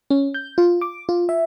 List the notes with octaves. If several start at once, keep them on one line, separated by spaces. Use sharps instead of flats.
C#4
G6
F4
D6
F4
E5